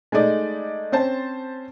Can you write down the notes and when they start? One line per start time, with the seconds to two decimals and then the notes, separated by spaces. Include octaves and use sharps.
0.12 G#3 A3 D#4 D5 D#5
0.92 C4 C#4 C5 A5